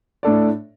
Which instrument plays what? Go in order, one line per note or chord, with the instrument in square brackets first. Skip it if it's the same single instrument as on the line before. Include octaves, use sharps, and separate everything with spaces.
[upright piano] A2 A3 D4 A4 D5